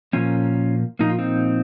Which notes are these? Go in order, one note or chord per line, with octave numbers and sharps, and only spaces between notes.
A#2 F3 A#3 C#4 F4
A#2 F3 A#3 D#4
F4
C4 D#4